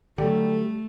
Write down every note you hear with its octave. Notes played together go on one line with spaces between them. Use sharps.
D3 F#3 G3 A3 A4